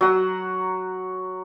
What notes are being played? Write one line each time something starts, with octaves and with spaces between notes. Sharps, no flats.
F#3 F#5